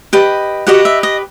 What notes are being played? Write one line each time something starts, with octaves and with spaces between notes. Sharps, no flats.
G4 B4 D#5
F#4 G4 B4 D#5 F#5
E5
D#5